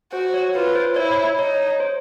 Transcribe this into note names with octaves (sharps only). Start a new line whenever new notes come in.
F#4 C5
C#5
F4 B4
C5
E4 C#5
D#4 C#5
C5